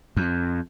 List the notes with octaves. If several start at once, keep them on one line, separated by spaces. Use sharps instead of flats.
F2